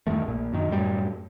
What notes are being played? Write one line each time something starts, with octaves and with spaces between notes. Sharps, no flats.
E2 G2 D#3 A3
A#1 A#2
F#2 D#3
F#2 A2 G3